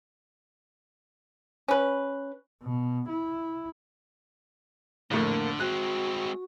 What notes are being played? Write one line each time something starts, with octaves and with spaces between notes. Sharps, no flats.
C#4 B4
B2
E4
A#1 F2 A2 D3 A#3
G#3 C4 F#4 F#6